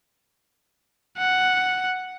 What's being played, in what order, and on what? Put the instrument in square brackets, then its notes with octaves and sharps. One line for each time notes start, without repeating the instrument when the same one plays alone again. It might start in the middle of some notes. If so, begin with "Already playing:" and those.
[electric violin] F#5